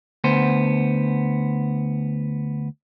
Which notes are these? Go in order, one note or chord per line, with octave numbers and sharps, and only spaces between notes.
D2 B3 C5